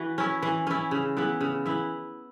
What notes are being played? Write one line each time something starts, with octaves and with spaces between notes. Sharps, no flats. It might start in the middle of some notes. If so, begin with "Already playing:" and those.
Already playing: E3 F#4 B4
C#4 E4
E3
C#4 E4
C#3
E3 B3 E4
C#3
E3 B3 E4